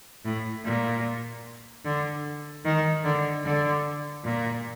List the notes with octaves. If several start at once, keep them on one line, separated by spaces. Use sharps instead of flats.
A2
A#2
D3
D#3
D3
D3
A#2